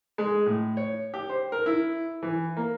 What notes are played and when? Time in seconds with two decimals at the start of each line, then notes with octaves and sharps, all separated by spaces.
0.18 G#3
0.46 A2
0.77 C#5
1.14 G4
1.30 C5
1.52 A#4
1.66 E4
2.22 E3
2.57 A#3